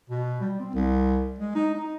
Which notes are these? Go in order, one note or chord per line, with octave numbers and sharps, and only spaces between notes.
B2
G3
C4
C2
G#3
D#4
D#4